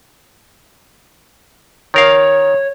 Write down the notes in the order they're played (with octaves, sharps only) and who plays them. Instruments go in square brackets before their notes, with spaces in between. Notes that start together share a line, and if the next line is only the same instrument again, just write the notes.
[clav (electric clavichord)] D#3 A#4 F5 [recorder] C#5